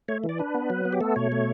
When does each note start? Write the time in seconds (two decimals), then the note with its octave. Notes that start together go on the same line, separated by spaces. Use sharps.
0.08 A3 C#5
0.24 E3
0.29 D5
0.39 D4 B4
0.54 B3
0.70 F#3
0.85 B3
0.93 G4
1.01 A3 A4
1.16 B2 C#5
1.32 A3